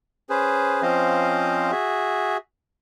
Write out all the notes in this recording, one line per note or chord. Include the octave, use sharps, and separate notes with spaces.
C#4 G#4 B4 C5
F3 C4 C#4 C5 D#5 F5
F#4 G#4 E5